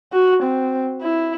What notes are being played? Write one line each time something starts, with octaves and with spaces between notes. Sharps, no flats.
F#4
C4
E4